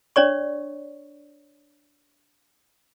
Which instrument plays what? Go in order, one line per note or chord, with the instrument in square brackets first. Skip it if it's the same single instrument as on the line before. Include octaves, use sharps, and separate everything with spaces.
[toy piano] D4 C#5 D5 C#6